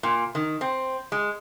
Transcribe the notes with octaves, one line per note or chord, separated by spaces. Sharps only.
A#2
D#3
C4
G#3